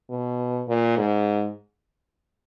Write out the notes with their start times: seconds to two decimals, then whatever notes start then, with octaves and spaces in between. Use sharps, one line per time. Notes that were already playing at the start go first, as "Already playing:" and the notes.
0.10 B2
0.68 A#2
0.97 G#2